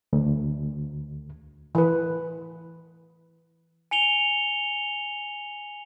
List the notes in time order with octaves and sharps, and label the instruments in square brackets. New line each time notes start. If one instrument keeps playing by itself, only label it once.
[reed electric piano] D2
[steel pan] E3 B4
[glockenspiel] G#5 C#7 F7 G7